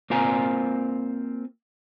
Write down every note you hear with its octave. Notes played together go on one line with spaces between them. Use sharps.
A#3 C4 F4 F5 G#5 A#5